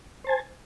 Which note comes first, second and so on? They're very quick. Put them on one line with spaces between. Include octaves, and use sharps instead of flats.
C5 A5 G#5